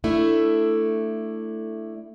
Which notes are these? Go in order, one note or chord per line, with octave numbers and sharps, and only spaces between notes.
A3 D4 E4